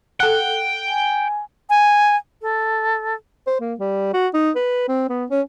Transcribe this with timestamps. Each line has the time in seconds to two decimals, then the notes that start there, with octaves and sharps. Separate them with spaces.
0.20 A4 F#5 G5
0.89 G#5
1.70 G#5
2.42 A4
3.47 C5
3.60 A#3
3.79 G3
4.13 F#4
4.34 D#4
4.55 B4
4.88 C4
5.09 B3
5.30 C#4